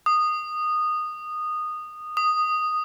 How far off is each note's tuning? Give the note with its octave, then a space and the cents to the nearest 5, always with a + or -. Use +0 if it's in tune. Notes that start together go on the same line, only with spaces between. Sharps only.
D#6 -15
D#6 -5